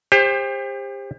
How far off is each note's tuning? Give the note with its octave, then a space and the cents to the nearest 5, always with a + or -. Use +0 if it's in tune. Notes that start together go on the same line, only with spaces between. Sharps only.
G4 +35 C5 +20